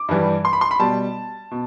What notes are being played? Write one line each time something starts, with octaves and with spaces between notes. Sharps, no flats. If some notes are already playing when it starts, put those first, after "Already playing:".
Already playing: D6
G2 E3 G3
C6
B5
C6
B5
B2 G3 A5
B2